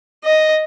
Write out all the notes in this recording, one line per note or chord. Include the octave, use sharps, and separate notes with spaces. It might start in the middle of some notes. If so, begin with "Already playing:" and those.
D#5